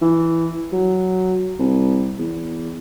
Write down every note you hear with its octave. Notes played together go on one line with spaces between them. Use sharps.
E3
F#3
C2
E2